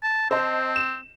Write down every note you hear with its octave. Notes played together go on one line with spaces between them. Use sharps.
A5
C4 C5 D#5 A5
E7